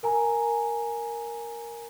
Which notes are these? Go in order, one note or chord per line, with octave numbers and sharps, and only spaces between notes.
A#4 G#5 A#5